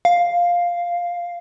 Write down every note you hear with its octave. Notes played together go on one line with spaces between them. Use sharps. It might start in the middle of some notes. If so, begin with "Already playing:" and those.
F5